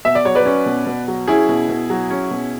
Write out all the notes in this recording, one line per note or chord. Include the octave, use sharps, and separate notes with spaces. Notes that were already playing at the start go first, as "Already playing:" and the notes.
B2 E5
D5
F#3 C#5
B4 D5
C#4
B2
B2
F#3
C#4 E4 G#4
B2
B2
F#3
C#4
B2